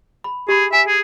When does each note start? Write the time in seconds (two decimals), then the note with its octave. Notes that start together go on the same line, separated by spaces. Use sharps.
0.24 B5
0.49 G4 G#4 B5
0.73 E5 G#5
0.88 G#4